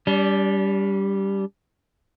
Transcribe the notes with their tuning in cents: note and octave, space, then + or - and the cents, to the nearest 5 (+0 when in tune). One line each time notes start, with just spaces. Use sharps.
G3 +0 D4 -40